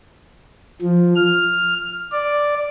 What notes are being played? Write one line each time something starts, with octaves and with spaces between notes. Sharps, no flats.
F3
F6
D5